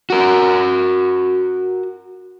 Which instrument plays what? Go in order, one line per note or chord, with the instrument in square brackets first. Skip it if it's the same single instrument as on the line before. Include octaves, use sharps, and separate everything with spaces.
[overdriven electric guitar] F#4 A#4